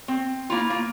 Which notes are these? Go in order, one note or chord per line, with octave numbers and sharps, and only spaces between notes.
C4
A#3 E4 F4
A#3